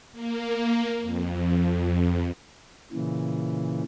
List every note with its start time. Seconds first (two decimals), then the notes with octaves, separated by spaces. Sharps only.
0.12 A#3
1.01 F2
2.92 A#2 C#3 E3